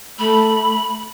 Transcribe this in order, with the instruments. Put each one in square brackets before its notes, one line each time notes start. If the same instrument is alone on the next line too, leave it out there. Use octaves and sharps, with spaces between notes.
[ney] A3 [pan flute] B5